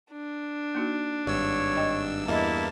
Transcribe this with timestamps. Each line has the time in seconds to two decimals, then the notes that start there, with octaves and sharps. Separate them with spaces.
0.12 D4
0.75 A#3 D#4 F#4
1.26 G#1 G2 C#5 E6
1.76 D#5 G5
2.28 E2 G2 A#3 E4 D#5 E5 A5